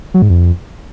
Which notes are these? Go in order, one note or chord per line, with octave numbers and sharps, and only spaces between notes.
F#3
G#2
F2